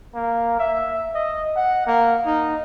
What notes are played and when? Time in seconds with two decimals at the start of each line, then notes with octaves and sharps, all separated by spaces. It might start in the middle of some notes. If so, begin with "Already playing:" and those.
0.15 A#3
0.59 E5
1.15 D#5
1.56 F#5
1.87 A#3
2.26 D#4